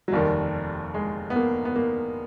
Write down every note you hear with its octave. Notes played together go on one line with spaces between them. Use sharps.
F#3
F1 D#2 D#3 G3
G#3
B3
A#3
B3
A#3